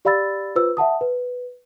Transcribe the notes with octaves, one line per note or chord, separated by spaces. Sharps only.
G4 D5 F5 B5 E6 A6
F4 B4 C5 E6
E5 F#5 A5 D#6
B4